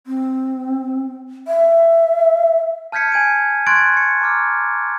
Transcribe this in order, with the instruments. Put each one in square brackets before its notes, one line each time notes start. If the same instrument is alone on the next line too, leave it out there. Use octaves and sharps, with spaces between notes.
[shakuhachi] C4
E5
[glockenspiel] A5 F6 G6 G#6 B6 C#7
G#5 G#6 D7 D#7
C6 C#6 F#6 G#6 A6 D7
C#7
A#5 D6 F6